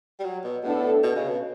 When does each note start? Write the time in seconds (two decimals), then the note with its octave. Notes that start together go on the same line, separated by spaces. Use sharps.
0.19 G3
0.24 F#3
0.44 B2
0.64 A2 B3 D4 A4
1.03 B2
1.15 C#3
1.28 B2